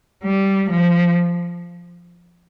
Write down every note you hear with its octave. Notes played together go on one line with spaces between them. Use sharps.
G3
F3